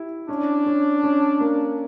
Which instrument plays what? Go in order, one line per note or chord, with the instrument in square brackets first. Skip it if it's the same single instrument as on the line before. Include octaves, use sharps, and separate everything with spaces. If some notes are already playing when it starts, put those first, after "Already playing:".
Already playing: [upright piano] E4 G4
[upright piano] C#4 [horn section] D4
[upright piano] C#4
C#4
A#3